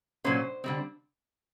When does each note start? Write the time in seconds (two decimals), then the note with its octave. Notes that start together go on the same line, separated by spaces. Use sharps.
0.24 A#2 F#3 A#3 C#4 C5
0.64 D3 G3 C4